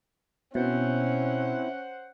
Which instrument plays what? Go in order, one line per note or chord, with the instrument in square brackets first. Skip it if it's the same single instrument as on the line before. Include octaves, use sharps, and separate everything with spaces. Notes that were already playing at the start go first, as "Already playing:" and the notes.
[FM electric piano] B2 [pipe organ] C4 E4 [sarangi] C#4 [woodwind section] C5 F#5